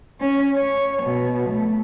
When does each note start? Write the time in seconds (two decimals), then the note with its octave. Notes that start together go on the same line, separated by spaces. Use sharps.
0.21 C#4
0.56 C#5
1.03 B2
1.49 A3